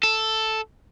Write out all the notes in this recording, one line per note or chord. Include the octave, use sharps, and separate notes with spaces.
A4